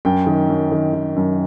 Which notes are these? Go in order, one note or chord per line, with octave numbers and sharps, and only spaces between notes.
F#2 G5
D#3
F#2
D#3
D#3
F#2